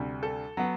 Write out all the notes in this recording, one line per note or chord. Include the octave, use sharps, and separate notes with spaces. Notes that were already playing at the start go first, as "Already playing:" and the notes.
Already playing: D2 C3 G3
A4
F#3 B3